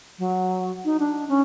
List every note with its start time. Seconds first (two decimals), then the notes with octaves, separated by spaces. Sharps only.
0.19 F#3
0.85 D#4
1.00 D4
1.29 C#4